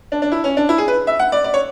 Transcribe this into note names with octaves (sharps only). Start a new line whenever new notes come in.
D4
D4
E4
C#4
D4
E4
G#4
B4
E5
F#5
D5
D5
C#5